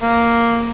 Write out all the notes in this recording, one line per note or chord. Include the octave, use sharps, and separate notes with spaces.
A#3